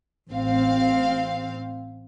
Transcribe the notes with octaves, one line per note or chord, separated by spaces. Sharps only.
A1 C4 F5